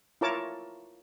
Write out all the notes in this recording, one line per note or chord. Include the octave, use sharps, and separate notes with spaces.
E4 F4 A#4 C#5 A5 D6